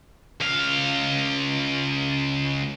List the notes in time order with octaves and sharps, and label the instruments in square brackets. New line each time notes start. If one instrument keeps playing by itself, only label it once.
[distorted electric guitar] C#2 F5